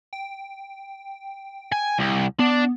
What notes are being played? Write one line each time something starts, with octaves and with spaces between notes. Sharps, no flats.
G5
G#5
C2
B3 D4